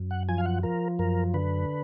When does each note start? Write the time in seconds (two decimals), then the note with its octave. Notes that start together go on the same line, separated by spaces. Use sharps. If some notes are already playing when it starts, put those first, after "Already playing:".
Already playing: F#2
0.11 F#5
0.29 F3 G#5
0.38 F5
0.46 F#5
0.63 F3 A#4
0.99 F#2 A#4
1.34 D3 B4